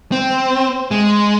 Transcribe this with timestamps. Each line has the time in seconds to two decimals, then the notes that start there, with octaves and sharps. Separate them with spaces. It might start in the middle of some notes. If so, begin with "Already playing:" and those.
0.12 C4
0.91 G#3